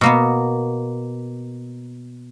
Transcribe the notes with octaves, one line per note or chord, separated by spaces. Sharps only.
B2 A#3 B3